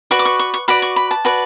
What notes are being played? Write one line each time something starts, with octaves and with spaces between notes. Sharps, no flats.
F#4 B4 D5 C#6
D6
C#6
C#6
C#6
F#4 B4 D5 B5
C#6
B5
A5
F#4 B4 D5